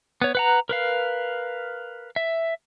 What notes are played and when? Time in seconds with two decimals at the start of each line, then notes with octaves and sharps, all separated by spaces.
0.22 B3 C#5
0.35 B4 F#5 A#5
0.69 A#4 B4 F5
2.16 E5